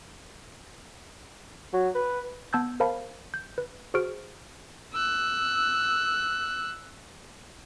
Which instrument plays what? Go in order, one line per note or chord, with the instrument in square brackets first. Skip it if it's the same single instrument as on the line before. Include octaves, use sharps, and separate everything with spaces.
[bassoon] F#3
B4
[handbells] B3 A5 E6 G6 G#6
A#4 C5 F5 A5 B5
G6
B4
F#4 G#4 C5 C#6 F6 D7
[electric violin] E6 F#6